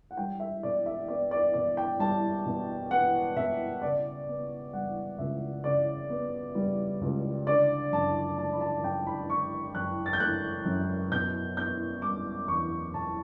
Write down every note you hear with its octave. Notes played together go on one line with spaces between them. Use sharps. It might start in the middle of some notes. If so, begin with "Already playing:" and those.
F#5
G3 G5
E5
B2 D5
E5
B3 D5
D5
B2 D5
G5
G3 A5
B2
B3 F#5
B2 E5
C#3 D5
B3
G3 F#5
C#2 E5
C#3 D5
B3
G3
C#2
D3 D5
F#2 A5
A3 A5
B5
A5
F#2 G5
B5
D3 C#6
F#2 F#6
A6
G6
A3 F#6
F#2
B2 G6
B3 G6
G3 D6
E2 C#6
B2 A5